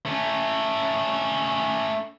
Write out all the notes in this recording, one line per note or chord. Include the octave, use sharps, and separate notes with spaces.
A3 C#4